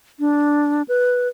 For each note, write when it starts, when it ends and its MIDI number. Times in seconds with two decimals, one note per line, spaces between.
0.20 0.83 62
0.88 1.28 71